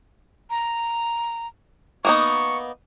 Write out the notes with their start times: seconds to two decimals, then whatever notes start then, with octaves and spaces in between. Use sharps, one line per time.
0.50 A#5
2.05 A#3 B3 D#4 C#6